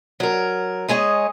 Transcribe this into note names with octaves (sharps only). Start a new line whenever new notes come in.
F#3 A#4
G#3 G#4 C#5 D#5